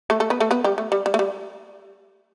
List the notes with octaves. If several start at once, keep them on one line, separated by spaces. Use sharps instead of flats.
A3 A4
A3 A4
B3 B4
A3 A4
B3 B4
G3 G4
A3
G3
G3
A3
G3